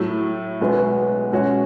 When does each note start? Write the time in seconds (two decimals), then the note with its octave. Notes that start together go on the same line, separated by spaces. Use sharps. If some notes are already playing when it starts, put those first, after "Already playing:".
Already playing: A2 F#3 A3 E4
0.61 B1 B2 G#3 B3
1.32 B2 G#3 C#4 F#4 C#5